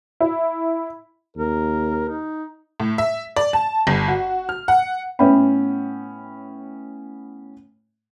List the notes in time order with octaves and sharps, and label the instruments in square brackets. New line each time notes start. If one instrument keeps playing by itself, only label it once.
[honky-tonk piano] E4
[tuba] D#2 [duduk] A#4
[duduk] D#4
[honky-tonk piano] A2
E5
D5
A5
G1
F#4
F6
F#5
[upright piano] A2 B3 C#4 E5 G5 B5